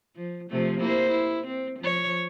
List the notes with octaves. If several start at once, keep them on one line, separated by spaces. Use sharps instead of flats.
F3
C3 F3 A3
A#3 E4 C5
E4
C4
F3 C#5